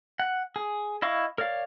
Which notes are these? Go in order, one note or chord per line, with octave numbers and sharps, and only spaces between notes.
F#5
G#4
E4 D#5 F5 C#6
A#4 C#5 D5 F5